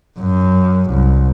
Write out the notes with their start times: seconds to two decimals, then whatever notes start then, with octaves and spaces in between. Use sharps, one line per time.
0.19 F#2
0.90 C2